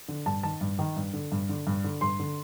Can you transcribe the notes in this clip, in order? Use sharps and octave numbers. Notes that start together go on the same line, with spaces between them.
D3
G2 A5
D#3 A5
G2
D#3
G2
D3
G2
D3
G2
D3
G2 C6
D3